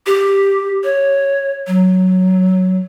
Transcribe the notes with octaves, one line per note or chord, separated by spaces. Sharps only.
G4
C#5
F#3